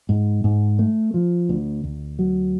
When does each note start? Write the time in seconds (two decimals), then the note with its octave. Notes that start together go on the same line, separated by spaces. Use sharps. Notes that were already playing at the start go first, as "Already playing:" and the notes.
0.09 G#2
0.44 G#2
0.79 A3
1.14 F3
1.49 D2
1.83 D2
2.19 F#3